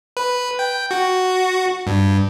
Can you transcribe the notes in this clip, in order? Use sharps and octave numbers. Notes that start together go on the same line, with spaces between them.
B4
G5
F#4
G2